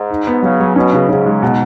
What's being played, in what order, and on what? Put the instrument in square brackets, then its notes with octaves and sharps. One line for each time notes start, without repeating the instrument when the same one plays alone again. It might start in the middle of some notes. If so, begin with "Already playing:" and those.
Already playing: [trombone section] G#2
[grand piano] D#4
B3
[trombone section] C#3 [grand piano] F#3
[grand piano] F#3
[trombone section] B2 [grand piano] C#4
[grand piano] C#3
[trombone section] G#2 [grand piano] C#3
[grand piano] G#3
B2